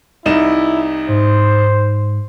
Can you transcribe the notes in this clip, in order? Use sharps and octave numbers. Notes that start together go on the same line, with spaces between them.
C2 D#4 E4 E7
G#2 C5